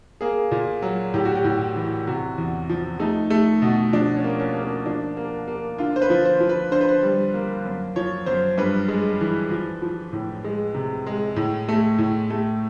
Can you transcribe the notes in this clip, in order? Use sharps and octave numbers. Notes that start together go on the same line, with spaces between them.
A#3 G#4
A#2
F#3
A2 G4
F#4
G4
A2
E3
C3 F#4
E2
F3
A3 D#4
A3
B2
F3 D4
C#4
A#3
C#4
A#3
C#4
F3 D4
A#3
A#3
D3 F4
C5
B4
F3
C5
F3
B4
D3 C5
B4
C5
G3
A#3
F#2
F3 C#5
F#2 C5
G2 B4
G#3
E3
F3
F3
A2
G#3
C3
G#3
A2
A3
A2
A3